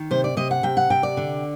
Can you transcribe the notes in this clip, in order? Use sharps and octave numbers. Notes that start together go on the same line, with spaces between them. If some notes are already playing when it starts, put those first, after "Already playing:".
Already playing: D#3
C3 C5
D5
C3 D#5
F#5
C3 G5
F#5
C3 G5
D5
D3